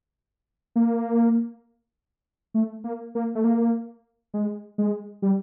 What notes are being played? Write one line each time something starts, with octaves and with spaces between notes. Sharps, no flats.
A#3
A3
A#3
A#3
A3
A#3
G#3
G#3
G3